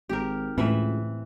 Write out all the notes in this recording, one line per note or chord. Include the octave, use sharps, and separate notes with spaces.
G#1 G4 A#4
C#2 A2 E3 C4 B4 E5